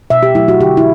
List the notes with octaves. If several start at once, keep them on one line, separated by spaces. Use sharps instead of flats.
B2 E5
G4
F#3 A3 E4
F#4
D3 G4
E4